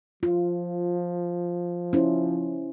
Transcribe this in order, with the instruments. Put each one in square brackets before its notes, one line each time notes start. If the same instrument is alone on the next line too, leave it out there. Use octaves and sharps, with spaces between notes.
[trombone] F3 [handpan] F4
[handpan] C#4 E4 C5